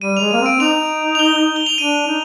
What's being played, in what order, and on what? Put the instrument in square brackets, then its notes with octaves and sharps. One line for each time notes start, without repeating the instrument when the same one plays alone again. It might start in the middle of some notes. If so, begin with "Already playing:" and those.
[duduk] G3 [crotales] D#7
[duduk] G#3 [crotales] F7
[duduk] A#3 [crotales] D#7
[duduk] C4
[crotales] D7
[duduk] D#4 [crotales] F7
[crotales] F7
G7
G7
F7
[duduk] D4 [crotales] D#7
[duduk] D#4